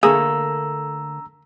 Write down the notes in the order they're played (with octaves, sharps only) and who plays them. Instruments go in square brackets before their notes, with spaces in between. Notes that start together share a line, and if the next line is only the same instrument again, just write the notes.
[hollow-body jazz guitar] D3 A3 A#3 [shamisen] G#4 [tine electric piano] A#5 E6